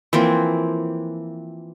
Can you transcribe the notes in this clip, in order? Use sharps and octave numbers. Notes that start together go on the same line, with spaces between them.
E3 F3 A#3 C4